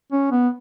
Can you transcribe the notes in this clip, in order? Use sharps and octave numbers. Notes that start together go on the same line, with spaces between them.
C#4
B3